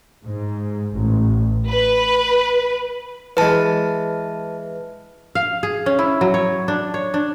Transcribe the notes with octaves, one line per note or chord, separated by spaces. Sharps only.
G#2
A1
B4
E3 G#3 B4 A5
F5
G#4
C#4
E4
F#3
C#5
D4
C#5
D4